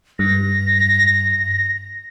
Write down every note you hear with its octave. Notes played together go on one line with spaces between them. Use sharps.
G2 A#6